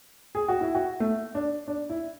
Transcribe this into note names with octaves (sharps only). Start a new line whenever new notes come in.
G#4
F#4
E4
F#4
A3
D4
D4
E4